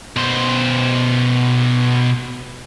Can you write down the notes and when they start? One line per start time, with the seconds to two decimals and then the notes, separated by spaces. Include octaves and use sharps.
0.16 B2 C5